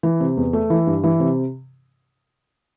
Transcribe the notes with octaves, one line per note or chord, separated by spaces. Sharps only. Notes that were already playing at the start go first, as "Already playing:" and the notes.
E3
C3
E2
A3
E3
G2
E3
C3